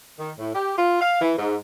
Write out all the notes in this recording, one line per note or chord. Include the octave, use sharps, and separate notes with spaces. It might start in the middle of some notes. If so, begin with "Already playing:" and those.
D#3
A2
G4
F4
F5
E3
G#2